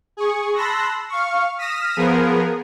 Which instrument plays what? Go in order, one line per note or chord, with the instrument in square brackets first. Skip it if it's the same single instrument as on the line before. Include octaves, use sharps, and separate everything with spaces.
[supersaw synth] G#4 C#6
A5 B5 C6 E6 F#6 A#6
F5 C#6
D#6 F6 A#6 B6 D#7 E7
F3 B3 G#4 A#4